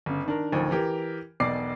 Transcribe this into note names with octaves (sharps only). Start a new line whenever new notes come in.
G1 C#3
D#3 D4 A#4
A1 D2 D#3 F3
E3 G4 A#4
E1 B1 B2 D5 D6 C7